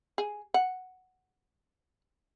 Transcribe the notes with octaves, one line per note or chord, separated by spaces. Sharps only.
G#4
F#5